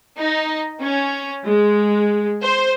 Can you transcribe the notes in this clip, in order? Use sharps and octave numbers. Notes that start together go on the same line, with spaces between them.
D#4
C#4
G#3
C5